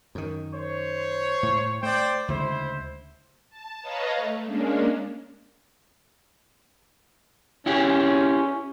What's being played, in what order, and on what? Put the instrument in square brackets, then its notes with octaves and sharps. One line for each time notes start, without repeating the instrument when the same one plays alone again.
[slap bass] F#2 D#3
[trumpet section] C5 C#5
[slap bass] A2
[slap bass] A3 [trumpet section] C5 D5 G5
[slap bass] D2 C#3 G#3 [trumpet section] E4 C5
[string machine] A5
B4 C#5 D#5 F5 A5 A#5
A3
G#3 A#3 C#4 D4
[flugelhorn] C#4 [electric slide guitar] E4 G4 G#4